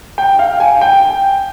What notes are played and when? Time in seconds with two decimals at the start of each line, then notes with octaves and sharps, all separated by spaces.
0.18 G5
0.39 F5
0.60 G#5
0.81 G5